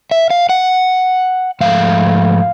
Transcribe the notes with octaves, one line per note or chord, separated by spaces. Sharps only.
E5
F5
F#5
G#2 F3 A3 F5